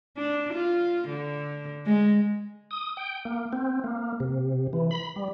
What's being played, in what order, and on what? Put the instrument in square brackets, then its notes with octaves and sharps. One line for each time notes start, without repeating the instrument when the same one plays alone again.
[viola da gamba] D4
F4
D3
G#3
[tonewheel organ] D#6
G5
A#3
C4
A#3
C3
E3
B5
G3